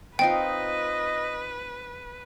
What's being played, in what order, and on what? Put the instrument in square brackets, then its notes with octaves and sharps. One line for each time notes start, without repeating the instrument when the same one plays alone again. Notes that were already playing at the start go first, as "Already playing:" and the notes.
[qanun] C4 D#4 F4 [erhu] B4 [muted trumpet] D#5 [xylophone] G5